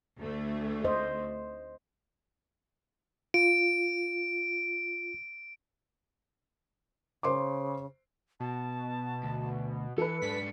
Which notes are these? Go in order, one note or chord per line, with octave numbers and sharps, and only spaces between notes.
D2 A3
C5 D#5
F4 D7
C#3 C5 C6 D6
B2 A5
D2
E3 A4 B4 C#7
G#2 D4 B6